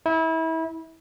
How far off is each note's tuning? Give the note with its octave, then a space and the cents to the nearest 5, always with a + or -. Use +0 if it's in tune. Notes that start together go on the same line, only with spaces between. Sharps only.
E4 -30